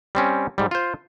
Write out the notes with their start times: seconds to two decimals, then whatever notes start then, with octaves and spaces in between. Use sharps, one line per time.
0.15 G3 C4 C#4
0.58 G#2 G3
0.71 F4 C5